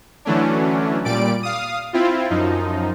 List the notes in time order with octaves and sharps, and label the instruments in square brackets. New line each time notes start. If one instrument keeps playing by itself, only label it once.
[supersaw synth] D3 E3 F#3 A3 C#4 D4
A#2 G3 D5 D7
F5 D#6
C4 E4 F4
F#2 F3 D#4